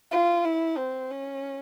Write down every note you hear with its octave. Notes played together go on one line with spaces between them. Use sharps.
F4
E4
C4
C#4